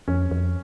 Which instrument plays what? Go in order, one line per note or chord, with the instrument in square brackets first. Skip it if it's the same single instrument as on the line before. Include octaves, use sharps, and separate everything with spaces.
[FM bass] F2 [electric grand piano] C#4
[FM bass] F2